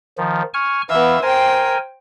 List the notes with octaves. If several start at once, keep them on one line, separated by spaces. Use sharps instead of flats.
D#3 F3
G#5 C#6 F6
E3 B3 E5 F5
A#4 C5 G5 G#5